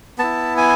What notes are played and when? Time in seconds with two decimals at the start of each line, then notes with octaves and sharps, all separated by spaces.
0.19 B3 E4 A5
0.57 G#5